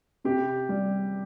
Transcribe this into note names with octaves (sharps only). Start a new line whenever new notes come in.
C3 G4
G3